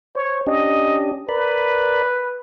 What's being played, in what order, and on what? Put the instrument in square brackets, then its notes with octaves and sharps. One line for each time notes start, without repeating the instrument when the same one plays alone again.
[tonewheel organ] C5 [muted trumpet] C#5
[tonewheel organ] C#4 D4 G4 [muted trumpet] D#5
[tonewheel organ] A#4 D5 B5 [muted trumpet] B4